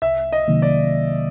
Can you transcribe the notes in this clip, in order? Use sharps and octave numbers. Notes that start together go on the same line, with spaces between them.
C2 E5
D#5
C3 D#3 F#3 A#3
D5